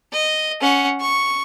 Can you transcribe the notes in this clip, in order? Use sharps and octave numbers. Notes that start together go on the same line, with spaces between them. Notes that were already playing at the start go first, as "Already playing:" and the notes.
D#5
C#4 F#5
C#6